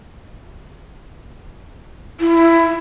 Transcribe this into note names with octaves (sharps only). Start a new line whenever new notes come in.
E4